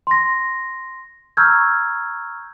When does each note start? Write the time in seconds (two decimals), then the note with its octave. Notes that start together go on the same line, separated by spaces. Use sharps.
0.07 C6 A#6
1.37 A#5 C#6 E6 F6 G6 G#6